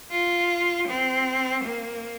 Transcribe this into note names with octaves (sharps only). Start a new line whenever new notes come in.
F4
C4
A#3